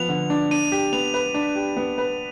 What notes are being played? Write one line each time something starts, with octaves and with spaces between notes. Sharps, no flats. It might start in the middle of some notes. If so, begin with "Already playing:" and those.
Already playing: F3 B3 F7
D3
D4
D4 D#7
G4
B3 F7
B4
D4
G4
B3
B4